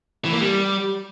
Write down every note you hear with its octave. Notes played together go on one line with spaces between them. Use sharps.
E3
A#3
G3